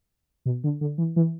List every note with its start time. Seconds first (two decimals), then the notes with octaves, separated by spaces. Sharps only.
0.45 B2
0.64 D3
0.81 D3
0.98 E3
1.16 E3